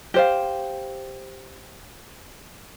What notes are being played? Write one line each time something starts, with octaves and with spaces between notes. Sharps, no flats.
G4 C5 F5